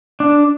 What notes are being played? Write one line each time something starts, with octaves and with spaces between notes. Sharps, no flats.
D4